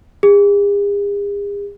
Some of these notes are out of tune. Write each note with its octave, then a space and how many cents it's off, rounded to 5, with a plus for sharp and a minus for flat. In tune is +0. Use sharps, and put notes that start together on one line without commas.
G#4 -45